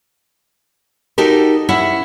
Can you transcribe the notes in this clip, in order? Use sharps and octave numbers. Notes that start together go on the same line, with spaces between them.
D#4 F#4 G4 A4 A#4
C#4 E4 E5 F#5